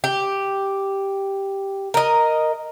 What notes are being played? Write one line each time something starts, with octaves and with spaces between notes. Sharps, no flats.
G4
A#4 D#5